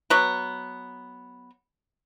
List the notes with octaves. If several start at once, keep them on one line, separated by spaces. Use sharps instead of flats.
F#3 B3